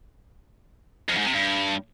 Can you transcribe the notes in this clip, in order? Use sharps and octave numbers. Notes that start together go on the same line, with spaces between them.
F2
G#2
C3
G2